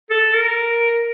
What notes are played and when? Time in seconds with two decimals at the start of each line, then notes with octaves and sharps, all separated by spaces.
0.10 A4
0.34 A#4